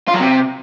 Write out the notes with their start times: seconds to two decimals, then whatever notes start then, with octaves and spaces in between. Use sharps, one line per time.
0.08 F4
0.14 F#3
0.20 C3